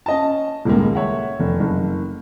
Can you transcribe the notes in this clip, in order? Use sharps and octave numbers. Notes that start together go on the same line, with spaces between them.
C#4 D#5 A5
D#1 C#2 G#3 A#3
C#5 E5 F#5
F1
F#1